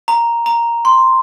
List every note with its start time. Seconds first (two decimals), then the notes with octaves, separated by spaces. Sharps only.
0.08 A#5
0.46 A#5
0.85 C6